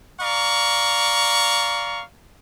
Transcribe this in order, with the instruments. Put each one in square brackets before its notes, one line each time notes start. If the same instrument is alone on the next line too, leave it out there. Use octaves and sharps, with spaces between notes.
[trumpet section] D5 F5 A#5 C#6